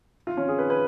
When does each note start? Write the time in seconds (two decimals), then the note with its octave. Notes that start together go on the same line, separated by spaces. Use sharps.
0.27 F4
0.37 C#4
0.48 G#4
0.58 B4
0.70 B4